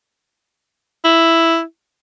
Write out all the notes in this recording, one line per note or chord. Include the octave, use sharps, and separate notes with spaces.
E4